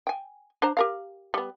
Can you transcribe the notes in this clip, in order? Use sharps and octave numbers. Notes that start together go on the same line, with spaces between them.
G5 G#5
D4 C5 A#5
G4 A#4 F5
G3 B3